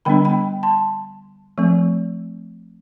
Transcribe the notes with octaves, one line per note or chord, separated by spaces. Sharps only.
D3 G3 B3 D4 G5 B5
G5 B5
A5 C6
F3 A3 C4